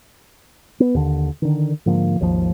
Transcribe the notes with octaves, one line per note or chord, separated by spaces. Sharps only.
B3
D#2 D3
D3 D#3
G#2 D3 F3 A#3
G#1 D#2 C3 F3